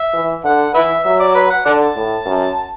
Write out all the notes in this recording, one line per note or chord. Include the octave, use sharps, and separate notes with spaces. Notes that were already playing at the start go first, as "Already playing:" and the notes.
Already playing: E5
E3
D3 F#5
E3 B4 E5
F#3 E5
D5
B4
F#5
D3 D5 F#5 A5
A2
F#2